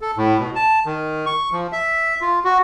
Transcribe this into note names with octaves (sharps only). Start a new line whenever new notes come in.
A4
A2
B2
A5
D#3
C#6
F3
E5
F4
F#4